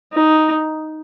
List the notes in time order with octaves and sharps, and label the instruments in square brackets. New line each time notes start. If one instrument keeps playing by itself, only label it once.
[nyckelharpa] D#4